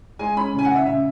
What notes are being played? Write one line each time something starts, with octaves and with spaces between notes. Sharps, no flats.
G#3 G#5
C#4 B5
C#3 G#5
F#5
C#3
E5
C#3 E5